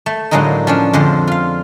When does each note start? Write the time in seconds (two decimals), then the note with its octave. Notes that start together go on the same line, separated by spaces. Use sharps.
0.06 A3
0.31 A2 D3 F#3 G#3 A#3 D#4
0.67 F3 C#4 D4
0.93 F2 D3 G#3 C5
1.27 F4 F5